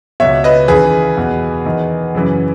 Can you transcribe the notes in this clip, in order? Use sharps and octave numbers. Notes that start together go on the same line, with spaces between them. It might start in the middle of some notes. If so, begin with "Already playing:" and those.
C#2 B2 C#5 E5
B4 D#5
D#2 C#3 E3 G#4 B4
E2 B2
E2 D#3
F#2 C#3 E3